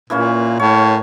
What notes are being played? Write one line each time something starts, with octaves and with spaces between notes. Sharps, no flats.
A#2 E3 A#3 C#4
A2 C#5